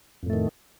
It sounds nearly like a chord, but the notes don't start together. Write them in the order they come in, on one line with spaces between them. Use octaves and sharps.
F2 A2 A3 D#3